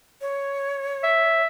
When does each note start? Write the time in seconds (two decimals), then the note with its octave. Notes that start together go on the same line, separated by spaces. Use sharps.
0.21 C#5
1.03 E5